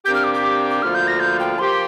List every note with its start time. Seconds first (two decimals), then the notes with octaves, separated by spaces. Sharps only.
0.05 C3 A#3 D4 G4 G6
0.15 F6
0.24 D6
0.34 D6
0.70 D6
0.82 D2 D3 F3 A#3 F4 F6
0.95 G6
1.08 A#6
1.20 G6
1.39 G5
1.58 F3 A#3 G4 C5 C6